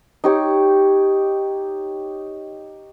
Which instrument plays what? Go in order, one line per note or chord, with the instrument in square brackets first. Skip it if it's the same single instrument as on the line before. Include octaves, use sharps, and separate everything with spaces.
[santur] D#4 G4 C#5